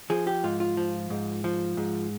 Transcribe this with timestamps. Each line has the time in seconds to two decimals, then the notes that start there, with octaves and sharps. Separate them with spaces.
0.10 F3 G#4
0.27 G4
0.44 G#2 F4
0.60 F4
0.77 F3
1.10 G#2
1.44 F3
1.77 G#2